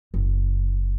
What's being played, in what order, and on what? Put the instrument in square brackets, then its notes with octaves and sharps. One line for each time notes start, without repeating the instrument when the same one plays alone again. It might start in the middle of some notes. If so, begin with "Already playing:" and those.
[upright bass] F#1